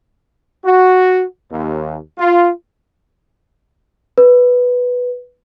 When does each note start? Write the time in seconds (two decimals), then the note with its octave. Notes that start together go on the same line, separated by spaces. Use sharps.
0.65 F#4
1.51 D#2
2.18 F4
4.18 B4